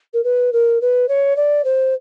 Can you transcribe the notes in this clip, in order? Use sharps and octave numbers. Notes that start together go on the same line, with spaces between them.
A#4
B4
A#4
B4
C#5
D5
C5